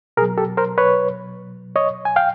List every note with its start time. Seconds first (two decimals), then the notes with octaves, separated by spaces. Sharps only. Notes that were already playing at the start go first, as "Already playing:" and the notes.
0.17 B2 G#4 A#4
0.22 F#3
0.38 G4 A4
0.57 A#4 C5
0.78 B4 C#5
1.76 C#5 D#5
2.05 G#5
2.16 F5 G5